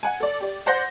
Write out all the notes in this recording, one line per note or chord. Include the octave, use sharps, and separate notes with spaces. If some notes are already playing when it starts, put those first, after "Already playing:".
F#5 G#5
A4 D5
G4 D5
C5 D5 F#5 C6 G6 A#6